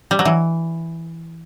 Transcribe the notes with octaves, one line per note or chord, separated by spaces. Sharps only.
G3
F#3
E3